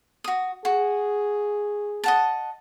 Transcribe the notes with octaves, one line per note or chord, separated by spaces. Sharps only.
F#4 D#6
F#4 G#4
D#5 F#5 A5